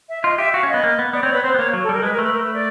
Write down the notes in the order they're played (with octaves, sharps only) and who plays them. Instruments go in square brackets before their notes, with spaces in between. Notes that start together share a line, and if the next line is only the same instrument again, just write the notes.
[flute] E5
[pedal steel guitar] F4 [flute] D#5
[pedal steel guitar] G4 [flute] E5
[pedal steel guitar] F#4 [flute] F5
[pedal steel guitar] C#4
[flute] D#5
[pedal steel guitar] B3
A#3
B3
[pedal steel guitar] B3 [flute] D5
[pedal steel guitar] C4 [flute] C#5
[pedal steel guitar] B3 [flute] B4
[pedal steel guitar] C4 [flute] C5
[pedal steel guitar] B3
[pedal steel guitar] A#3 [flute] C#5
[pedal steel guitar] F#3
[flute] A4
[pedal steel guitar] G3 [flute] A#4
[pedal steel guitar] G#3 [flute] B4
[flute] A#4
[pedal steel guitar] A3
[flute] B4
[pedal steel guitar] A3 [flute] A#4
[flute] B4
D5